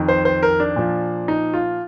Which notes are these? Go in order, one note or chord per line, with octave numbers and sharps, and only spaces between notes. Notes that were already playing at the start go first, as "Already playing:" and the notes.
Already playing: F2 D#3
C5
C5
A#4
D4
A#2 F3
D#4
F4